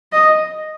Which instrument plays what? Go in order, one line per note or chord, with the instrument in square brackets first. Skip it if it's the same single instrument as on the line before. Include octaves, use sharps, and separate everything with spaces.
[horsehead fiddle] D#5